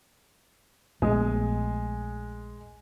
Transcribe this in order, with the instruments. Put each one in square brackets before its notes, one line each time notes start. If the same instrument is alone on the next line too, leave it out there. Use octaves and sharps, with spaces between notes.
[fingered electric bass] A#1 A3 B3 [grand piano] G#3 D#6